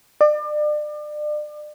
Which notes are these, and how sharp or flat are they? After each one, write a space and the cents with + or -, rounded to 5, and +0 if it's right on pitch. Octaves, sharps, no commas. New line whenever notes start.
D5 +35